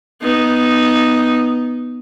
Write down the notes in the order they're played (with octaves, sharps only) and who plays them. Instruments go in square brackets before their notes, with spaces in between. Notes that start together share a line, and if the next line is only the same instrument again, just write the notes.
[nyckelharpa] B3 D#4